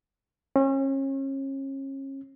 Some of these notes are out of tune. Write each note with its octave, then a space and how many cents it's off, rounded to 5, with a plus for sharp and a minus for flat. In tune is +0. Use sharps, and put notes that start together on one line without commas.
C#4 -35